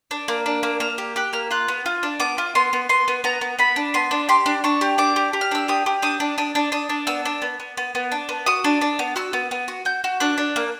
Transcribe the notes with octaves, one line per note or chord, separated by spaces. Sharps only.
D4
A#3
D4
A#3
A#3 F6
G4
G4 F#6
A#3 F6
F4 F#6
B3
F4
D4
B3 D6
F4
B3 C6
B3
B3 C6
B3
B3 A#5
B3
B3 B5
D4
B3 C6
D4
G4 C6
D4
D4 C#6
G4
D4 D6
G4
G4
F6
D4 E6
G4 D#6
G4
D4 D#6
D4
D4 D#6
D4
D4 D#6
D4
B3 E6
D4
B3
B3
B3
B3
D4
B3
F#4 D#6
D4
D4
B3
F#4 E6
B3
B3
F#4
F#4 G6
F#4
D4 F#6
D4
A#3